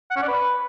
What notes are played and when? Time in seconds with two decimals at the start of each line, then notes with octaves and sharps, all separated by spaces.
0.11 F#5
0.17 C#4
0.22 D5
0.28 B4